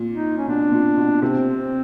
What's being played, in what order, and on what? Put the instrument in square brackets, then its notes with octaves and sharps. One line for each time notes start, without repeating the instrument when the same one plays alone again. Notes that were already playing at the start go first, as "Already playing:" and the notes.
Already playing: [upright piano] A#2
[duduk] D#4
C#4
[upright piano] B2 [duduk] D4
[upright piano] A#2
B2
[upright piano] C3 [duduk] C4